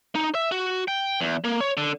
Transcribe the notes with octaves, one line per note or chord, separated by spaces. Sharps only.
D#4
E5
F#4
G5
E2
A#3
C#5
D3